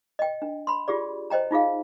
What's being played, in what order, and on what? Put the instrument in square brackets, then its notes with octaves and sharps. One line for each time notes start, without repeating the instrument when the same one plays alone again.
[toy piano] D#5 G5
D4
B5 C6
F4 G4 G#4 D5
C5 D#5 G5 A#5
D#4 F4 G#4 F5